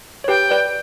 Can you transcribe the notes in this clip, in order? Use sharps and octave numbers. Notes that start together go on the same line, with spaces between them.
C#5
G4 B4 G5
B4 D5